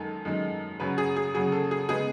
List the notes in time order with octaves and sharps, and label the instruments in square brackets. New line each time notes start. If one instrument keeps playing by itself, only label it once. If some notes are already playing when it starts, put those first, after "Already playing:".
Already playing: [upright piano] F#2 D#3 G#3 A4
F#2 D#3 G#3
F#2 C#3 F#3 B4
G#4
G#4
F#2 C#3 F#3 G#4
A4
G#4
C#3 G#3 B3 G#4